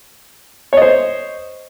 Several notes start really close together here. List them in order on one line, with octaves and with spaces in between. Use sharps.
C#5 D#5 C5